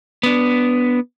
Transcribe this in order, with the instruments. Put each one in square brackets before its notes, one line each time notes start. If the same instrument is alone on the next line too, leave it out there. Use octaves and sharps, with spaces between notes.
[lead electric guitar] B3 D4